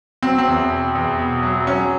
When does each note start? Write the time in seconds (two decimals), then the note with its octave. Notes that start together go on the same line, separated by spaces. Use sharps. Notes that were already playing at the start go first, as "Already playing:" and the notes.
0.23 F#3 C4
0.38 C4
0.47 E2
0.70 B2
0.95 E2
1.18 B2
1.43 F#3
1.67 F#3 C#4